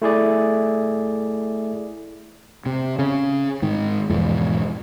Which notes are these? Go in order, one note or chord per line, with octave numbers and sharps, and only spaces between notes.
A3 E4 G#4 D5
C3
C#3
G#2 D#3
E2 G#2 B2 F3